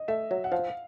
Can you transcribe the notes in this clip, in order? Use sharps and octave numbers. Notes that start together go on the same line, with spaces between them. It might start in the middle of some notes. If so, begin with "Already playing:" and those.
Already playing: D#5
A3 E5
F#3
F#5
F3 F5